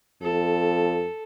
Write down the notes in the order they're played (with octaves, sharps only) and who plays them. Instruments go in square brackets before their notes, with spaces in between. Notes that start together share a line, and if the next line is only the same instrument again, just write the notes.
[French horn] F2 [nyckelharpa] A4